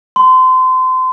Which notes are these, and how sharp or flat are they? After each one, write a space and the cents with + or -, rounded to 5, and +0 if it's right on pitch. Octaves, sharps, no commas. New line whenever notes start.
C6 -30